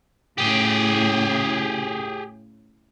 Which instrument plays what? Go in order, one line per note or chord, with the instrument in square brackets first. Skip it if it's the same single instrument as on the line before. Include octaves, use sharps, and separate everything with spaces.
[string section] A2 C#3 [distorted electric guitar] G4 G#4